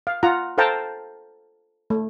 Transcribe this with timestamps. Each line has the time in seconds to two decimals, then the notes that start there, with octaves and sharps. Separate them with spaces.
0.07 F5
0.23 F4 F#5 A#5
0.58 A4 C5 F5 G5 A5 A#5
1.90 A3